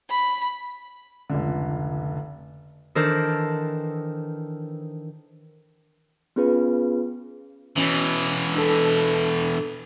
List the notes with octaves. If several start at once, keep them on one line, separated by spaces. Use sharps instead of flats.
B5
F1 C#2 D3
D#3 E3 D4 A4 A#4 C5
B3 C#4 F4 G#4 B4
B2 E3 C#4
D4 A4